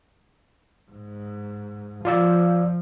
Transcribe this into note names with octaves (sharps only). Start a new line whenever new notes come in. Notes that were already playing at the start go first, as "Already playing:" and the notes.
G#2
F3 F4 D5 E6